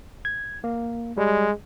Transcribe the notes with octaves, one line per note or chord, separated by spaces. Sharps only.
G#6
A#3
G3 G#3